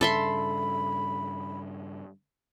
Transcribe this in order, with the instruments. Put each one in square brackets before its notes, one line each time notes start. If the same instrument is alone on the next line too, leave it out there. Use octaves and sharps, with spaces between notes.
[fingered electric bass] G2 C#3 [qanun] A4 E5 C6 [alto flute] B5